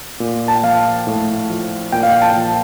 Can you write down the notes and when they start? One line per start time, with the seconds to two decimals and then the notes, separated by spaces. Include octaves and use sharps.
0.20 A#2
0.48 A5
0.55 G5
0.63 F3 F5
1.07 A2
1.50 F3
1.92 A#2 G5
2.03 F5
2.12 G5
2.22 A5
2.36 F3